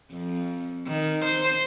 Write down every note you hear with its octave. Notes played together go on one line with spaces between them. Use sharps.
F2
D#3
C5